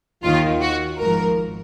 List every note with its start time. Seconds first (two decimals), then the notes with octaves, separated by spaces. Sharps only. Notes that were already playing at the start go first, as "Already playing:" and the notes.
0.23 D#2 D#3 F4
0.62 F#4
1.00 G#1 G#2 F3 A#4